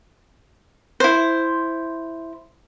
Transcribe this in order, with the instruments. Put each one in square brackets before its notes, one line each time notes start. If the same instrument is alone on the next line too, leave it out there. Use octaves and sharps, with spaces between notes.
[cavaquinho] E4 C5